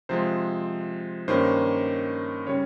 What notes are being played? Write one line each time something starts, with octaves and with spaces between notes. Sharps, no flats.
C3 F3 G#3 C5
G2 D#3 A#3 C#4 C5
C#3 G3 C#4 C#5